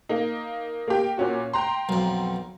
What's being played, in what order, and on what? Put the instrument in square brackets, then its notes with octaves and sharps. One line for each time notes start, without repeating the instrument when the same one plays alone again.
[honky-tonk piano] A#3 D#4
A#3 G4
A#2 C#4 F#4
G5 A#5 C6
[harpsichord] B1 F2